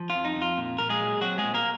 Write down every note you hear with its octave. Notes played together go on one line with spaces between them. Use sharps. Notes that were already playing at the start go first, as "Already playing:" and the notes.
Already playing: F3
F4
F2
D#4
F2
F4
A#2
A#2 A#4
G#3 G#4
F#3
F#3 C4 F#4
G#3 G#4
A#2
A#3 A#4